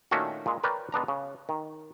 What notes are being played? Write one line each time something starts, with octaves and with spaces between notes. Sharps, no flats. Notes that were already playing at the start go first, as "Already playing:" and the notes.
A#2 D#3 A3 C#4 D4 F#4
A#2 G#3
A#4 B4 C#5 D5 G5
G#3 B3 D4 A#5
C#3
D#3